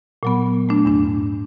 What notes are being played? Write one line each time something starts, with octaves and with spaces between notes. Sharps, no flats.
A#2 F#3 B3
A3 D4
E2 G#2 D4